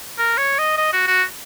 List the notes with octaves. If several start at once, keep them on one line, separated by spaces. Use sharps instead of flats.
A#4
C#5
D#5
D#5
F#4
F#4